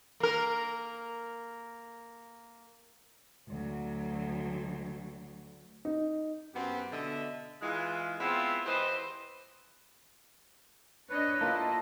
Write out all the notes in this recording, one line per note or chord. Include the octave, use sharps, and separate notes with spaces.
A#3 A#4
D2 F#3
D#4
F#2 B3 C4 F#4 G4 F#5
B2 D3 D#5 E5
E3 G#3 F4
G#3 B3 C4 E4 F4
E3 G4 B4 C5 D#5 C6
D4 B4 C#5 D#5
A#3 E4 F4 A4 D#5 A5